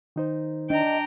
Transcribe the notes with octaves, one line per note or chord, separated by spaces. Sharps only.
D#3 D#4 C5
D4 D#5 G5 A#5